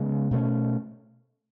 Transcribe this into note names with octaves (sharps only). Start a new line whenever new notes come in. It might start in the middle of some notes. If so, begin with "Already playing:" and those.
Already playing: C#3 G#3 B3
B2 A3 C#4